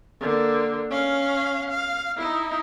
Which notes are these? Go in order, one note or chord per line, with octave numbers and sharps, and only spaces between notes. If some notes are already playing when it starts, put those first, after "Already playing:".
D3 A#3
C#4 F5
F5
D#4 E4